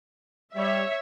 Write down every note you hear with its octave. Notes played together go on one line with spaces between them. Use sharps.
G3 C#5 E5